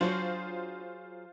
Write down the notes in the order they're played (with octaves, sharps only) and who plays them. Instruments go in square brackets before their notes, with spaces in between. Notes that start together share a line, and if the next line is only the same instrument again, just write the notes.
[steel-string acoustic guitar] F#3 G#4 [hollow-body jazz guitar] D4 F#4 C#5 [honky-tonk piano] F4 C5